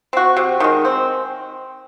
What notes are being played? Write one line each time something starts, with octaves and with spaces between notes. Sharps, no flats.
C4 F#4
C3
D#3 G#3
C4